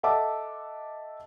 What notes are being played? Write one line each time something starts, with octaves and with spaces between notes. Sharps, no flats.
A4 D#5 E5 F#5 A5 D6